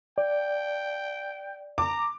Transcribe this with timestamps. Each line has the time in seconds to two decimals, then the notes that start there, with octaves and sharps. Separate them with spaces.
0.18 D5 G5
1.78 A#5 D6